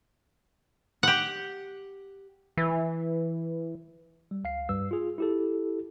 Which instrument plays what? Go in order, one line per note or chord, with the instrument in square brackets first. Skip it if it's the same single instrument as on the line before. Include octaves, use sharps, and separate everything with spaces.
[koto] G4 F#5
[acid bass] E3
[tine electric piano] G3
C#2 F5 C7
G2 G3 B4 E6
F4 G#4
E4 G4 A4